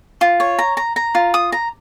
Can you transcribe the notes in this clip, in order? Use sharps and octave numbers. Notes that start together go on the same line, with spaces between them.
F4
C#5
A#5
A#5
A#5
F4
D#6
A#5